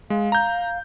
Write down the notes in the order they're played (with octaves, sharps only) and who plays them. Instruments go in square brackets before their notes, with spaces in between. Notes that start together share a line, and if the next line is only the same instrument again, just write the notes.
[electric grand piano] G#3 [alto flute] F5
[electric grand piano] A#5 G6